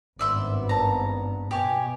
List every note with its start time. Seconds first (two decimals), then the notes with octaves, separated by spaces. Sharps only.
0.19 G#1 G2 B3 D5 E5 C6
0.69 A5 A#5
1.51 B2 G4 C#5 G#5